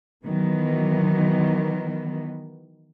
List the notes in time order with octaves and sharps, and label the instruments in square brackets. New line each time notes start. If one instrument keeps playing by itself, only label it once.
[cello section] D#3 E3 F#3 B3